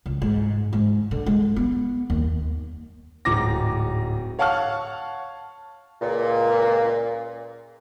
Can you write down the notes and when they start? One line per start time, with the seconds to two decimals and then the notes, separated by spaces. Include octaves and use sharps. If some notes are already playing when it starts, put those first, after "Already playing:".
0.06 C#2
0.22 G#2
0.73 G#2
1.11 D3
1.26 G#3
1.56 B3
2.10 D#2
3.25 D1 G#2 D#4 D6 A#6
4.39 C#5 F5 F#5 A5 C#6 F6
6.02 C#2 A#2